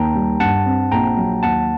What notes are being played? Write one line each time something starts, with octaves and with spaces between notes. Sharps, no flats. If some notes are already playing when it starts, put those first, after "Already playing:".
Already playing: D#2 G5 A5 A#5
G3
G2 F#5 A5
C4
A#1 G5 A#5
F#3
D#2 F#5 A5